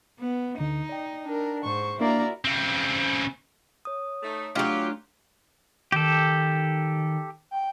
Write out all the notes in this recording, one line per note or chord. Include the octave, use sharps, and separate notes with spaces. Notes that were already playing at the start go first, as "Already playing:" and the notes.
B3
D2 D3 D#4
D5 G5
D4 A#4
G#2 C5 C#6
A#3 D4 E4 F#4 A#4 D5 A#5
C#3 C4
C#5 D#6
A3 D#4
F#3 A3 D4 F4 G4 A#5
D#3 G4 A4
G5